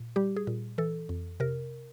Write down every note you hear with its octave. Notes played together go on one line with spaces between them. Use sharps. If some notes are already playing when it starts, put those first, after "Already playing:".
Already playing: A#2
G3 G4
G#4
A#2
E3 A4
F2
C3 A#4